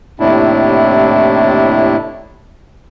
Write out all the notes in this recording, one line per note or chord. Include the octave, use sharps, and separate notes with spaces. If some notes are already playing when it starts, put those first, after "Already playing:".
D#2 A2 C3 D4 E4